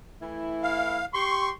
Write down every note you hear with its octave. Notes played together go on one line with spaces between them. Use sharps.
E3 A3 E4
F5
G4 C6 C#6